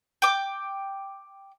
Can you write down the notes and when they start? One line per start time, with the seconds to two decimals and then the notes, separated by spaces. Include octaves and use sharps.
0.22 G5 D6